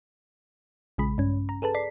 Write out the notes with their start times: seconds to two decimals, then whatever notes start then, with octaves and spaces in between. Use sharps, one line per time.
0.98 A#1 C#3 G#3 B5
1.18 G2 C#4
1.49 A#5
1.62 G#4 A4 B4 A5
1.75 D5 B6 C7